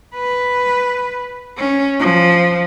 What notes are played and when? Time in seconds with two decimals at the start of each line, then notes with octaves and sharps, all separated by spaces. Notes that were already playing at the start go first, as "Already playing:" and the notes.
0.15 B4
1.57 C#4
2.00 F3